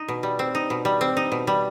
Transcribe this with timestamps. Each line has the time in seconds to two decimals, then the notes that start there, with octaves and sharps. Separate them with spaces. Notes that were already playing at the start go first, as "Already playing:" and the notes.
Already playing: D#4
0.08 B2
0.23 G3
0.39 C4
0.55 D#4
0.70 B2
0.85 G3
1.01 C4
1.17 D#4
1.32 B2
1.47 G3